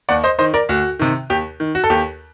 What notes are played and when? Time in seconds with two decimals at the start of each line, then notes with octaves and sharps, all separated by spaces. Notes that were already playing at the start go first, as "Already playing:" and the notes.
0.09 D#2 D5 F#5
0.24 C5 D#5
0.39 D#3 C5 D#5
0.54 A#4 D5
0.69 D2 F#4
0.99 C3 D#3
1.30 D#2 G4
1.60 D#3
1.75 F#4
1.84 A4
1.90 D#2 G4